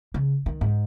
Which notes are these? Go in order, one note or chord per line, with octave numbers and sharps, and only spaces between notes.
C#3
D#3
G#2